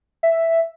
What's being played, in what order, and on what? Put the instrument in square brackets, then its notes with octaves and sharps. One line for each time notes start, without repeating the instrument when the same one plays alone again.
[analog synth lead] E5